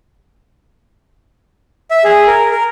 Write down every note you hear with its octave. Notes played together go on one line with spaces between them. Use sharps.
E5
G#4
A#4
A#4